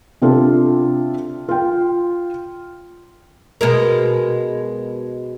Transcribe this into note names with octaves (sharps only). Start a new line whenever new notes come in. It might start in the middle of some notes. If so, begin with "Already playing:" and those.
C3 D4 F4 G4 A4
F4 G5
B2 G#3 A#4